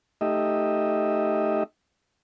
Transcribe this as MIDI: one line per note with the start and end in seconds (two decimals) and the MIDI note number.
0.21 1.63 57
0.21 1.63 63
0.21 1.63 67
0.21 1.63 75
0.21 1.63 76